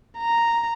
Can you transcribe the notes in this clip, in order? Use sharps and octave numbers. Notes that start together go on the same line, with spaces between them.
A#5